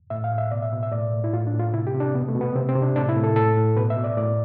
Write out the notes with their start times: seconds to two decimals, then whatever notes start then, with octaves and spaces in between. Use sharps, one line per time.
0.10 A2 E5
0.24 F5
0.32 A2
0.38 E5
0.51 B2 D5
0.62 E5
0.72 B2
0.83 E5
0.92 A2 D5
1.13 A2
1.24 E4
1.33 A2 F4
1.47 D4
1.53 A2
1.60 F4
1.73 C3 E4
1.87 G4
1.95 C3
2.00 D4
2.15 B2 B3
2.28 A3
2.35 B2
2.41 B3
2.56 C3 C4
2.69 C4
2.75 C3
2.82 D4
2.96 A2 D4
3.09 E4
3.16 A2
3.24 A4
3.36 A2 A4
3.57 A2
3.77 B2 B4
3.90 E5
3.97 B2
4.04 D5
4.17 A2 D5